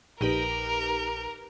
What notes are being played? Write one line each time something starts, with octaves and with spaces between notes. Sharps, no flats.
A#1 D#4 G4 A#4 B4